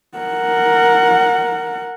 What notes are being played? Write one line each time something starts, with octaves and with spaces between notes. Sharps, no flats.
A#4 F#5